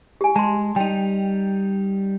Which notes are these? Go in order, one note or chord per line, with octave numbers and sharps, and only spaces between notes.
G4 G#5
G#3 A5 C6
G3 D#4 G5